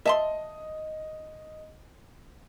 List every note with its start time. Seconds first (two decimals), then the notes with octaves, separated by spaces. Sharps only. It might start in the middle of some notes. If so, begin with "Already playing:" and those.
0.05 D#5 E5 A5 C6